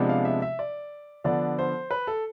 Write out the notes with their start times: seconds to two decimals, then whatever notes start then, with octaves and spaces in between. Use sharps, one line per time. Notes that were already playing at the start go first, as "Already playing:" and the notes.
Already playing: C3 F3 G#3 B3 D4
0.09 F5
0.25 E5
0.42 E5
0.59 D5
1.24 D3 F3 B3 D4 D5
1.59 C5
1.91 B4
2.07 A4